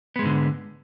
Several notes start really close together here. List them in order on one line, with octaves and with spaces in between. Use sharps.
B3 G#3 G#2 D3